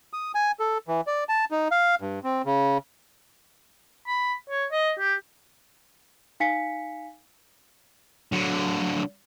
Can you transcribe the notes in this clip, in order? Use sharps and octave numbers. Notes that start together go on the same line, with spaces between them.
D#6
G#5
A4
E3
D5
A5
D#4
F5
G2
C4
C#3
B5
C#5
D#5
G4
D#4 F5 G#5 B6 C#7
D3 F#3